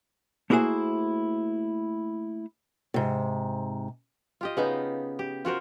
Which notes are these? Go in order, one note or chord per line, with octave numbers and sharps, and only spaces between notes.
A3 A#3 E4 F#4 G#4 C5
G#2 C3
F4 G4 D#5
C#3 B3 D#4
G4
F4 F#4 A#4 C5